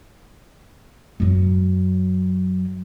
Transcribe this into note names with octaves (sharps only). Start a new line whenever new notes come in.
F#2 F#3